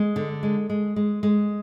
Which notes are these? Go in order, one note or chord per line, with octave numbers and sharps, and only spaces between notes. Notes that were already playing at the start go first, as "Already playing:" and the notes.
Already playing: G#3
D3
G#3
G#3
G#3
G#3